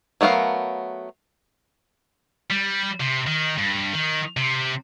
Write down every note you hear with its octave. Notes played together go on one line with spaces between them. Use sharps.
F#3 A3 B3 A#4 F5
G3
C3
D#3
G2
D#3
C3